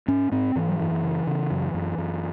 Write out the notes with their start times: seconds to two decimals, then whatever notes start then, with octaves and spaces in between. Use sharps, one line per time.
0.08 G#2 C#4
0.32 G#2 C4
0.55 G#2 E3
0.69 F#3
0.79 F#2 E3
1.03 C#3
1.27 C#3
1.51 F#2
1.74 F#2
1.98 F#2